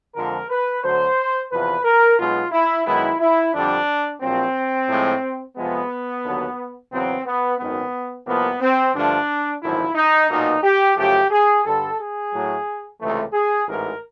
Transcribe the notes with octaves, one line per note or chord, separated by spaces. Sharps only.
F2 D3 F3 G#3 A#4
B4
D2 D3 F#3 C5
E2 C3 F3 B4
A#4
B1 B2 G#3 B3 F4
E4
F#2 D#3 G#3 B3 E4
E4
F2 D3 G3 D4
A#1 A#2 F#3 C4
A2 F3 G#3
F2 C3 F3 G#3 B3
D#2 D3 F#3
E2 C#3 F#3 B3 C4
B3
G#1 F#2 D#3 B3
C2 C3 F3 A#3 B3
C4
G2 D3 F3 A3 D4
G#1 F#2 D3 F3 E4
D#4
B1 A#2 F#3 A#3 D#4
G4
F#2 C#3 F3 A3 G4
G#4
G2 D3 G3 A4
G#4
A2 F#3 A3
C#2 C3 E3 A3
G#4
A1 G#2 E3 A#4